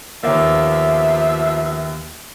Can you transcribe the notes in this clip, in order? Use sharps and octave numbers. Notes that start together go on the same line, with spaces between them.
D#2 F3 A#3 B3 E5